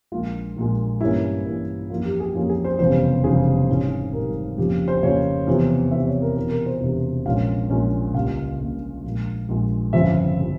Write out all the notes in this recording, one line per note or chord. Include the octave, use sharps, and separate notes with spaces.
A#1 A#2 G#3 F4
A#1 A#2 G#3
G2 E3 A#3 C#4 E4
G2 E3 A#3 C#4
F2 E3 A#3 C#4 F4
G4
G#4
F2 E3 A#3 C#4 F4
G#4
C5
F1 E2 C#3 G3 C5
F1 E2 C#3 G3 G#4
G#1 G#2 E3 G3 C#4
G#1 G#2 E3 G3 C#4 A#4
F2 C#3 F3 A#3 G4
C5
F2 C#3 F3 A#3 C#5
E2 C3 F3 C4
E2 C3 F3 C4 E5
C#5
A#4
E1 E2 C3 A#4
A#4
C5
E1 E2 C3
A#1 A#2 G#3 C#4 F5
A#1 A#2 G#3 C#4
C#2 C#3 G3 A#3 F5
C#2 C#3 G3 A#3
A#1 A#2 G#3
A#1 A#2 G#3
G1 F2 C#3 F3 C4 E5
C#3 F3 C4